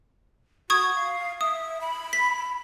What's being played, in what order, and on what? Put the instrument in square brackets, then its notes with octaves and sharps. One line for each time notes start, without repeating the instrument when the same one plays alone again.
[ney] F#4 [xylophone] C#6 D#6 G#6
[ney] F5
[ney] E5 [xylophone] D#6
[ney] B5
[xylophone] B6